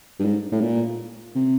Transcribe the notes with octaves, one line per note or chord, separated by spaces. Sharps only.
G2
G#2
A2
A#2
C3